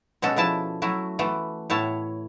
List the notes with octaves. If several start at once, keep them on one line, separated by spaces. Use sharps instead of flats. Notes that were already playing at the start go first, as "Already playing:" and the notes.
B2 G#3 C#4 F#4 A4
B2 F3 E4 A5
F#3 A3 E4 F#4
E3 A3 B3
A2 B3 E4 C#5 A5